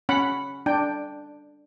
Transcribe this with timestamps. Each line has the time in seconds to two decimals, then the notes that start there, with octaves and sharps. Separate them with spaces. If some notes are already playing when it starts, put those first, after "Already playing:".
0.09 C#4 F#5 B5
0.66 D4 G5